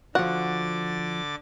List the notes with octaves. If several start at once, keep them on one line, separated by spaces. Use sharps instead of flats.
D3 F3 F#4 F#5 D6 A6